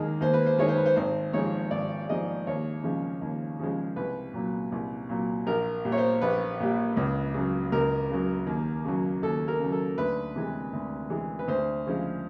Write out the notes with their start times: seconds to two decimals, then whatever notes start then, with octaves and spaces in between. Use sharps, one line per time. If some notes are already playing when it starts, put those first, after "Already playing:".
Already playing: D#2 D#3 G#3
0.21 D#2 C5
0.34 B4
0.46 C5
0.58 D#3 G#3 C#5
0.68 C5
0.77 B4
0.85 C5
0.96 G#1 C5
1.33 G#2 F3 G#3 C#5
1.71 G#1 D5
2.09 G#2 F3 G#3 D#5
2.47 D#2 C#5
2.83 C#3 F3 G#3
3.21 D#2
3.59 C#3 F3 G#3
3.96 C2 B4
4.34 A#2 F#3
4.72 C2
5.09 A#2 F#3
5.46 A#1 A#4
5.85 A#2 G3
5.92 C#5
5.98 C5
6.21 A#1 B4
6.60 A#2 G3
6.97 C#2
7.34 C#3 F#3
7.72 C#2 A#4
8.10 C#3 F#3
8.47 D#2
8.85 C#3 F#3
9.22 D#2 A4
9.48 A#4
9.60 C#3 F#3
9.72 A4
9.98 D2 B4
10.35 C3 E3 G#3
10.73 D2
11.10 C3 E3 G#3
11.39 B4
11.48 D2 C5
11.86 C#3 F3 G#3